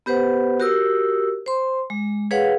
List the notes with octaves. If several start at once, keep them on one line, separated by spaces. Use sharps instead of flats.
B3 G4 B4 C5 F#5
F#4 G4 A#4 D#6 E6
C5 C6
G#3
G#4 B4 C#5 F5 F#5